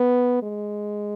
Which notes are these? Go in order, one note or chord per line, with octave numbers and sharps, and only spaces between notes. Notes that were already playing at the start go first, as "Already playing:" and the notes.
Already playing: B3
G#3